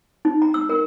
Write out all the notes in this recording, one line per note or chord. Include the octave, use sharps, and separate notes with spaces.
D#4
A#5
E6
A#4